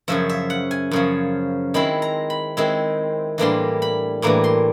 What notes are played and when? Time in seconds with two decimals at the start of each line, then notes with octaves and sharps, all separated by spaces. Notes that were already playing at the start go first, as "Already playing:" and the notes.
0.08 F#2 C#3 F3 E5
0.29 E5
0.50 F#5
0.71 G#5
0.91 F#2 C#3 F3
1.74 D#3 G#3 C4 E4 B5
2.02 A#5
2.30 B5
2.57 D#3 G#3 C4 E4
3.38 A2 E3 G3 A#3 D4 C6
3.82 B5
4.22 A2 E3 G3 A#3 D4 A#5
4.44 C6